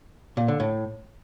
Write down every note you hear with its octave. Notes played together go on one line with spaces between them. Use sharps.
A#2
D3
A2